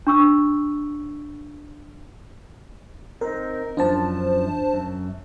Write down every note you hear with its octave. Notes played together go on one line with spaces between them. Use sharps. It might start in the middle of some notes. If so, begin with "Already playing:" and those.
D4 C#6 E6
C4 D#4 A#4
F#2 F3 D4 C5 A5
F#2